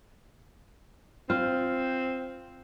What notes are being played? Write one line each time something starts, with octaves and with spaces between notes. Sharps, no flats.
C4 F4